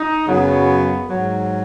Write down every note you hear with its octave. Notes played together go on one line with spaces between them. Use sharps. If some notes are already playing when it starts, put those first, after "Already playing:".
Already playing: D#4
F#2 C#3 F#3 B3
G#2 F#3